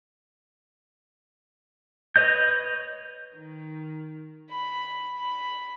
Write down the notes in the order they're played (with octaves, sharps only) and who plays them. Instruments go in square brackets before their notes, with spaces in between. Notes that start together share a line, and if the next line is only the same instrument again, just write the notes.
[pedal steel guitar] B4 C#5 D#5 G6
[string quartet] D#3
B5
B5